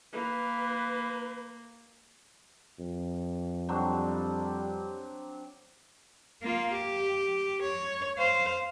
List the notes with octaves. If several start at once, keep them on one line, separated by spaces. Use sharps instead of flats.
A#3 B4
F2
F#3 G3 C4 D4
A#3 F4
G4
C#5
C5 F5